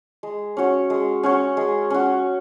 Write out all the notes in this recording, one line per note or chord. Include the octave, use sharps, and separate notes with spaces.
G#3
C#4 F#4 C#5
G#3
C#4 F#4 C#5
G#3
C#4 F#4